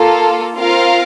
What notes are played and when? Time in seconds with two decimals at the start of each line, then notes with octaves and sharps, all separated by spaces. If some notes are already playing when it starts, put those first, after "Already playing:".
Already playing: A#3 F4 A4
0.56 C4 F4 A#4 F5